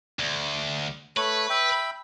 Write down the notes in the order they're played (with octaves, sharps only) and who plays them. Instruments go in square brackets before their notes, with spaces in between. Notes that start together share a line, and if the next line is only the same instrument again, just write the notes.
[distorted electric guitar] D2
[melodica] A3 C#5 [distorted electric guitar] B4
[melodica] E5 G5 B5